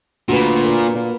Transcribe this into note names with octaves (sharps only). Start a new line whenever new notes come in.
D2 A#2 F#4 B4
A#4
A#2